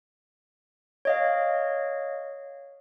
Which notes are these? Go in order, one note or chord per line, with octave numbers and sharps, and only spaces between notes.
C#5 D#5 F5